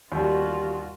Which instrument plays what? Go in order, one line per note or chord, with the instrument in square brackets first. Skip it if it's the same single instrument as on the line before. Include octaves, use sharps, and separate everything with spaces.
[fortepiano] D#2 G3 [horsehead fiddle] F4 F#4